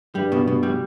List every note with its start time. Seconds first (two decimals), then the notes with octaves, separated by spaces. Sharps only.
0.15 G2 G3
0.32 B2
0.47 B2
0.63 G3